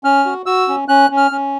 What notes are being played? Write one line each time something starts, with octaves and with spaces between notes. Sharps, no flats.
C#4 F6
F#4
F#4 E6
C#4
C#4 F#6
C#4
F6
C#4